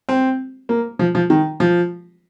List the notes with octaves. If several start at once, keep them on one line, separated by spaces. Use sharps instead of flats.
C4
A#3
F3
F3
D#3
F3